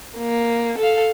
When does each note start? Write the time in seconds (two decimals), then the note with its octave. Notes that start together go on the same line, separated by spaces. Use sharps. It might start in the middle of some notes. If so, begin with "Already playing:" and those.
0.18 A#3
0.78 A4 F5